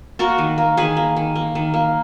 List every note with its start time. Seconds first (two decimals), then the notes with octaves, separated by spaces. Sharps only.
0.19 A#3 F#4 A#4
0.38 D#3
0.58 A#3
0.77 D#3 G#4 B4
0.97 A#3
1.17 D#3
1.36 A#3
1.55 D#3
1.74 A#3